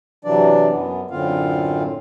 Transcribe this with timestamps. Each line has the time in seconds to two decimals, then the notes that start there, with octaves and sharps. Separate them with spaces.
0.25 C3 E3 F#3 D4 D5
0.70 F#2 B3
1.11 F#2 A2 D3 C4 F4 F5